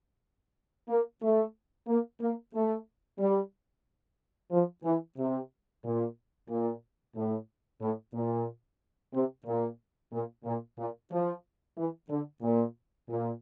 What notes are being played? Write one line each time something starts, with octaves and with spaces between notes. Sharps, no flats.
A#3
A3
A#3
A#3
A3
G3
F3
E3
C3
A#2
A#2
A2
A2
A#2
C3
A#2
A#2
A#2
A#2
F3
E3
D3
A#2
A#2